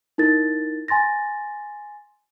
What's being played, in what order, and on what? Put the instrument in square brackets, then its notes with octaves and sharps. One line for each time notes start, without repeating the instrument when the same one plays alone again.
[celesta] D#4 E4 A#4 A6
G#5 C6 A6 A#6